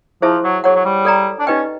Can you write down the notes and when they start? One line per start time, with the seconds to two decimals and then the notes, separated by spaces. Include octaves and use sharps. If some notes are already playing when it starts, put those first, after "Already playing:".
0.22 F3 E4 G#4 C5 E5 A5
0.44 F#3
0.64 F#3 G#4 C#5 F#5
0.75 F#3
0.85 G3
1.05 A4 D5 G5 A#5
1.39 D4
1.47 C#4 D#4 G4 B4 D#5 G5